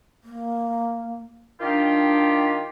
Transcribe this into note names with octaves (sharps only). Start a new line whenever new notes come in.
A#3
D#3 D4 F4 G4